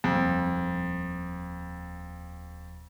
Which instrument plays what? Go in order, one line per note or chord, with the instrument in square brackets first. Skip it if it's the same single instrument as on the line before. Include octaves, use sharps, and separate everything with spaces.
[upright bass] D#1 [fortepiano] F2